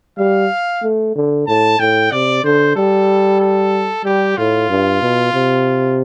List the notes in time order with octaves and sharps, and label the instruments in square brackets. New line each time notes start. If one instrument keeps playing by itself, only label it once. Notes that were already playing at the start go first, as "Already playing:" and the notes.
[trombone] G3 [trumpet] F5
[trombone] A3
D3
[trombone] A2 [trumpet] A5
[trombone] A2 [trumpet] G5
[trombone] C3 [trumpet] D5
[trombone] D3 [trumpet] C5
[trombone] G3 [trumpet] A4
[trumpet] A4
[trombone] G3 [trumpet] G4
[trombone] A2 [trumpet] F4
[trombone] G2
B2
C3